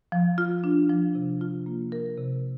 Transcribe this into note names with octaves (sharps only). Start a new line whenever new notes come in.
F3
F4
D4
F3
C3
F4
A#3
A#4
C3